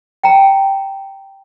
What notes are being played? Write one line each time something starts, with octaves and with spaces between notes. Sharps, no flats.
G5 A#5